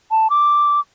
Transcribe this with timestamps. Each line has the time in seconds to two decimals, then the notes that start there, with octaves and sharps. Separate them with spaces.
0.11 A5
0.30 D6